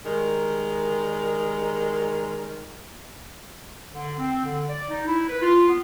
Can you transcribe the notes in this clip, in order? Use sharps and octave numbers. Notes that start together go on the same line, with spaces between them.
D#3 G3 G#3 A#4
D3
C4
D3
D5
D#4
E4
B4
F4
B3